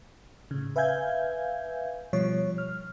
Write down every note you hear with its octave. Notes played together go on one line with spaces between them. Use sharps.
A2 C#3
B4 E5 F5 G#5 G6 G#6
B2 F3 G3 C#5
F6